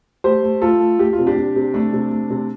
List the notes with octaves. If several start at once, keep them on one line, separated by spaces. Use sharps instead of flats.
A3 G4 C5
A3
A3 F4 A4
A3
A3 G4
F4
C3
D4 G4
C3
C3
A3 D4
C3
A3
C3